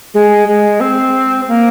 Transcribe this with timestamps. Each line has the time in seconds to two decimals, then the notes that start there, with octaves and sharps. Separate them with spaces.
0.14 G#3
0.48 G#3
0.80 C4
1.48 A#3